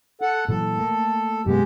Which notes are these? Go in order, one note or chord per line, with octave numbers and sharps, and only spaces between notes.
A4 F#5
A#2 E3 F#3 A4
A3 A#3
F#2 B2 G#3 B3 G4